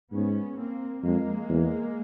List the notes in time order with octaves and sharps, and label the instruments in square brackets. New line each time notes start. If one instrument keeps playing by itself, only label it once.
[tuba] G#2 [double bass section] B3 C#4
[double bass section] A#3 C4
[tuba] F2 [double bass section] G#3 A#3
[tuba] E2